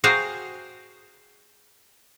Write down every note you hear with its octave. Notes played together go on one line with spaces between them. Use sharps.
F#4 G#4 C5 F5 G5 A#5